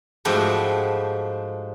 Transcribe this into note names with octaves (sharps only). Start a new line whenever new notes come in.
G#2 F3 A3 E4 F#4 G4